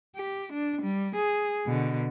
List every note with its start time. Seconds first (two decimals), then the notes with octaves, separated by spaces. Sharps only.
0.16 G4
0.53 D4
0.82 G3
1.16 G#4
1.67 B2 D3